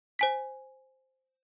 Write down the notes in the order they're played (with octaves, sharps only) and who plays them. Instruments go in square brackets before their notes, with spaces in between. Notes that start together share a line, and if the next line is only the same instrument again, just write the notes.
[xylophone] C5 G#5 B6